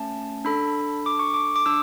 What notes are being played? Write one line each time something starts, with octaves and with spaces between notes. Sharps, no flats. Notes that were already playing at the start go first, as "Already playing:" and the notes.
Already playing: A3 C#4 A5
D4 A4 B5
D6
C#6
D6
D6
D4 E6